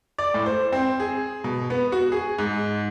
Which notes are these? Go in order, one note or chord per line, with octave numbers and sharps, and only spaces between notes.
D5
A2
C5
C4
G#4
B2
B3
F#4
G#4
G#2